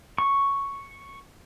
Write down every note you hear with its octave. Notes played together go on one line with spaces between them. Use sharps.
C#6